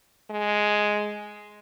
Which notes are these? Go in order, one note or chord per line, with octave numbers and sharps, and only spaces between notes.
G#3